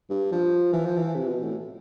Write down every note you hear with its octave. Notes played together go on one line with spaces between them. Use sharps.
G2
F3
E3
F3
E3
C3
B2
A2